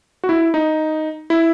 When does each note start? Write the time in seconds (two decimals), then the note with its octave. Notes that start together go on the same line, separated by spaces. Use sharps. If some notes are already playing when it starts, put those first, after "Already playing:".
0.24 F#4
0.29 E4
0.54 D#4
1.30 E4